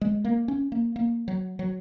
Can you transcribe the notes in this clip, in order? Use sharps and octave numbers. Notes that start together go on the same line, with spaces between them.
G#3
A#3
C#4
A#3
A#3
F#3
F#3